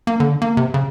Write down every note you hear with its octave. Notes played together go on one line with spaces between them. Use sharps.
A#3
D3
A#3
C3
C#3